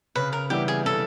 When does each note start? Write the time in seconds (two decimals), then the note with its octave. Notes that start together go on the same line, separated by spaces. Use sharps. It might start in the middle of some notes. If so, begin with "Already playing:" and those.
0.15 C#3 B4
0.33 A#4
0.50 E3 G3 B3 E4 G4
0.68 G#4
0.86 C#3 A4